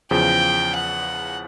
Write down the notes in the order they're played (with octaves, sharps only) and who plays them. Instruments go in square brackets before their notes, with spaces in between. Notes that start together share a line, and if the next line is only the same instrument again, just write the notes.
[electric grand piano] E2 C#3 F3 [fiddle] G5
[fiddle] F#5